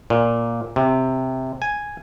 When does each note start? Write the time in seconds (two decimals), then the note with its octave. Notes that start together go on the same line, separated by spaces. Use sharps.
0.10 A#2
0.76 C3
1.62 G#5